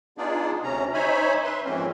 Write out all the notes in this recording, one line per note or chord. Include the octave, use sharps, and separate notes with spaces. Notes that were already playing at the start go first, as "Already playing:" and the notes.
B3 D4 D#4 F4 G#4 D5
D2 C3 C#4 A#5
D#4 C5 C#5 E5 G#5 B5
B4 E5 C6
F2 G#2 E3 A#3 C4 C#4